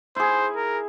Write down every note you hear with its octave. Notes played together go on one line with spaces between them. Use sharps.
E4 G#4 C5
A#4